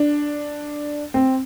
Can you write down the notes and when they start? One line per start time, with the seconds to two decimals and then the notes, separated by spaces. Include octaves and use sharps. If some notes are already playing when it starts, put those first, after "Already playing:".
Already playing: D4
1.14 C4